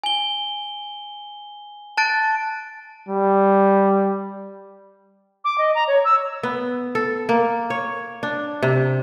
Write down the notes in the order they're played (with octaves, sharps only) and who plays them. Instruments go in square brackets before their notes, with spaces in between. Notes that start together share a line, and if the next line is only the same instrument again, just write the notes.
[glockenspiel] G#5 G7
A5 F#6 A6 D7
[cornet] G3
[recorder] D6
D#5
A#5
C#5
E6
[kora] B3
A4
A#3
C#5
D4
C3